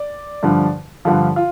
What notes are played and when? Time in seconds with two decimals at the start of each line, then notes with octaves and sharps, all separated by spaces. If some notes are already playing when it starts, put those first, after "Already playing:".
Already playing: D5
0.43 G2 D3 F3
1.05 G2 D3 F3 F4
1.36 F4